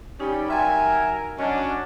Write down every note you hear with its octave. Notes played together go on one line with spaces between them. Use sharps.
G3 C#4 D#4 G4
F#3 A#4 E5 G5 G#5 C6 A6
F#3 C#4 D4 D#5